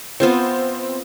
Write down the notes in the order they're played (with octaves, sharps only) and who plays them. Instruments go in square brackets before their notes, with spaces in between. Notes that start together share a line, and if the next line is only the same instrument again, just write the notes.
[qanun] B3 F4 C5 [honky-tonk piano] C4